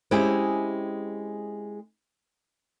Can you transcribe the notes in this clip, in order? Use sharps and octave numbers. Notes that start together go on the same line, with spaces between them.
G#3 C4 C#4 E4 G4 G#4